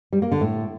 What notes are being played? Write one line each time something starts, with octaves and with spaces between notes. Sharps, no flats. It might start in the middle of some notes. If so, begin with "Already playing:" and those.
G3
A#3
D3
A2